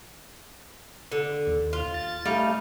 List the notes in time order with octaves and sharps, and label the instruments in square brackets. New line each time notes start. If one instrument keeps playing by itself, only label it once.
[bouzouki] D3
[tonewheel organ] D#2
[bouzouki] F4
[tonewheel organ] A6
[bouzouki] G3 D#4 F5 [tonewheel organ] A3